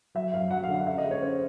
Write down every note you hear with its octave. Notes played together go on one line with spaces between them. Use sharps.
F#3 E5
F#2 F5
F#3 F#5
F5
D3
F5
C#4 E5
D#5
G#3
C#5
C#4 C5